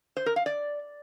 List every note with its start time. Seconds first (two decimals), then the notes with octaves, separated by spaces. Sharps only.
0.17 C5
0.26 A#4
0.36 F5
0.46 D5